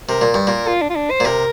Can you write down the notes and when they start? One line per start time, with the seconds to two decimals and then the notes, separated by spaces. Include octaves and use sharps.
0.08 C3 A#4
0.21 A#2
0.34 G2
0.47 A#2 A#4
0.68 F4
0.81 D4
0.90 F4
0.96 D4
1.11 C5
1.20 A#2
1.25 C3 A#4